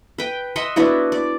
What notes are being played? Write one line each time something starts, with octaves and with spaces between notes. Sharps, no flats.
B4 G5
D#5 E5 F#5 C6
B3 D4 E4 F#4
D5